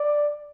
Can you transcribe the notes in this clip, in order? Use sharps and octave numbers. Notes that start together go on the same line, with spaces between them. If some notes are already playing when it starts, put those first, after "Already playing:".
Already playing: D5